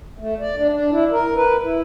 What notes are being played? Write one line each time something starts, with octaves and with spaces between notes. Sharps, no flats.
A3
D5
D4
D4
E4
A#4
B4
E4